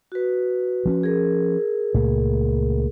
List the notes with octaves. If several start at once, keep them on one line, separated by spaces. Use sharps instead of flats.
F#4 B4
F3 C4 C#4
G#4 A#4
C#2 A#2 A3